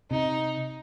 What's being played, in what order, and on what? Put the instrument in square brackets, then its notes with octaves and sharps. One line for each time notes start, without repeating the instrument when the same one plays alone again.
[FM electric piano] C3 [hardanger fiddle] D#4